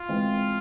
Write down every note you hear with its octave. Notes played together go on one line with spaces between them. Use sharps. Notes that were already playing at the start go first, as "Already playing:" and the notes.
Already playing: F4
E3 G#3 C4